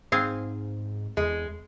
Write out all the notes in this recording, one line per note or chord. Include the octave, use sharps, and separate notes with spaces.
G#2 C4 G#4 F5
E2 G#3